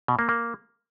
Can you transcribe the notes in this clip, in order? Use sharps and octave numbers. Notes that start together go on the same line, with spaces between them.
B2
A#3
A#3